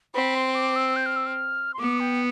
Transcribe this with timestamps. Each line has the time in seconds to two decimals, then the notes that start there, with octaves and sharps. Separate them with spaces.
0.14 C4 B5
0.35 C6
0.55 D6
0.76 E6
0.96 G6
1.06 F6
1.16 E6
1.26 F6
1.74 C6
1.79 B3 D6
2.00 G5